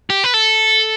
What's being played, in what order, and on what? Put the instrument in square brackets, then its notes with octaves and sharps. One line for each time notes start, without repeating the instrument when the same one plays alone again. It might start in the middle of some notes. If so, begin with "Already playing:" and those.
[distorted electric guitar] G4
B4
A4